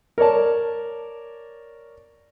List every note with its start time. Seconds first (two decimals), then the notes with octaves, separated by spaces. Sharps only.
0.18 A#4 C#5 D5 A5